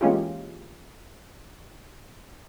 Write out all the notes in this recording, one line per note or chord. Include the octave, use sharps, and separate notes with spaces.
E3 G#3 A#3 C#4 F4 G4